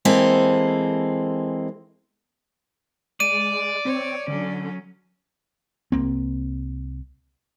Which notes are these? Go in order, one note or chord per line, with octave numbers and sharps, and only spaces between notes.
E3 G#3 A#3 C4 A4
G#3 D5 D#7
C4 C#5
D3 F#3 C#4
C2 A#3 C4